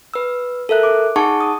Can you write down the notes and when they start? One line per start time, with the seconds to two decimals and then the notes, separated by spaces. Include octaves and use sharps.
0.14 B4 E6
0.69 A4 A#4 E5 F#6
0.83 D6
1.16 D#4 G#4 F#5 A5 C#6 D6
1.41 D#6